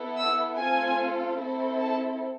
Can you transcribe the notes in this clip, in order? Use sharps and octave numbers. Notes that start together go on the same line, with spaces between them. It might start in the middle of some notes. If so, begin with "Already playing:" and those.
Already playing: B3 E4 A4
E6
A3 C4 F4 A4 G#5
C4 E4 A4
A5